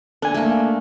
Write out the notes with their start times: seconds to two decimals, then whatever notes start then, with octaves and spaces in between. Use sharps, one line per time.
0.22 D4 A4 G#5
0.34 A3 A#3